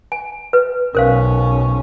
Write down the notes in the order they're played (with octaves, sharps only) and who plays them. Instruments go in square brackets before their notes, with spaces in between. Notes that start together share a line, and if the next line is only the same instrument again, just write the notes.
[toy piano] G#5
B4
[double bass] B1 C#4 [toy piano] A#4 C5 F5